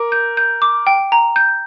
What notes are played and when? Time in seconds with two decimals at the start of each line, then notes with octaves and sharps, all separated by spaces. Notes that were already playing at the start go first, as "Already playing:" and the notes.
Already playing: A#4 D6
0.12 G6
0.37 G6
0.62 D6
0.87 G5
1.12 A#5
1.36 G6